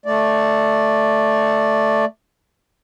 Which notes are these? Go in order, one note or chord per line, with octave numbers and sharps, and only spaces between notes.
A3 D5